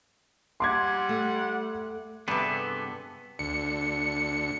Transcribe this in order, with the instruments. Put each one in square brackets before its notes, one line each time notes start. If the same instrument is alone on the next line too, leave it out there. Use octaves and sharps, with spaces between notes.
[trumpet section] G3 F#5 [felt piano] C6 D6 G#6
[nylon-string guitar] A3
[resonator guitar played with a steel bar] G2 C3 [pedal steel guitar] B3 G#4 A4
[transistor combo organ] D2 [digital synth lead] C#7